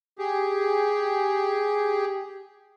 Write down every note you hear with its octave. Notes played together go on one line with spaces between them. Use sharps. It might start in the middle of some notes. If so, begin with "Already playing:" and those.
G4 G#4